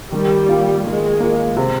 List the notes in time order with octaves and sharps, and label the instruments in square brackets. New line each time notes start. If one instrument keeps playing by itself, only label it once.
[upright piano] D#3 [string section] G3
[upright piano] A#3 F4
[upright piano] D#3 [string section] G#3
[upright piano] A#3 F4
C3